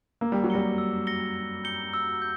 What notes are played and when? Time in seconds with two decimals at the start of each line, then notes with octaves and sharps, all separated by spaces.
0.21 A#3 E6
0.32 G3
0.44 F#3
0.50 G3 A#6 C#7 G7
0.78 E6
1.07 A#6 C#7 G7
1.35 E6
1.64 G6 C#7 G7
1.94 E6
2.22 G6